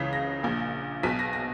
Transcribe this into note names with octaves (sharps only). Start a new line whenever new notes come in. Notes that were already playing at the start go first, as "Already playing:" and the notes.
Already playing: C#2 C#3 E3 B6
A#6
A#1 A#2
B1 B2 B6
A#6
A#6